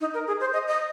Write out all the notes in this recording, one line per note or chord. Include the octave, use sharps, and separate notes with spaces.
D#4
A#4
G#4
C5
D#5
D#5